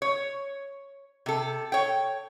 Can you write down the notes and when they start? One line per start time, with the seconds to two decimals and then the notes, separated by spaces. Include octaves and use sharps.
0.02 C#5
1.26 C3 A4
1.72 C#5 G5